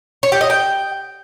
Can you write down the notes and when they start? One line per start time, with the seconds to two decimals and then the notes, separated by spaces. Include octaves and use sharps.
0.23 C#5
0.32 G4
0.41 D#5
0.50 G5